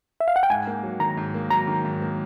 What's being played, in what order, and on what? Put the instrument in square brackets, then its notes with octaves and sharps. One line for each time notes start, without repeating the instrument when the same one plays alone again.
[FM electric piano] E5
F5
F#5
G5
[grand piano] G#2 [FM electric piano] G#5
[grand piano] A#3
F#3
[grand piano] D#3 [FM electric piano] A#5
[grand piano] G#2
A#3
[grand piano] F#3 [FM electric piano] A#5
[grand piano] D#3
G#2
A#3